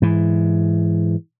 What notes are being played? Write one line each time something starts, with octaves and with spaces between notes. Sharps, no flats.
G#2 E3